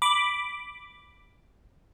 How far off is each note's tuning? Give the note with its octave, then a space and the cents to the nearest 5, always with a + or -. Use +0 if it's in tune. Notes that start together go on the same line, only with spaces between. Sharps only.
B5 +0 D6 +0